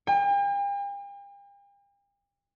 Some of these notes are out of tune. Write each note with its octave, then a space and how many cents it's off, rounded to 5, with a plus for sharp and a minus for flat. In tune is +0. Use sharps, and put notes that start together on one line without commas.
G5 +45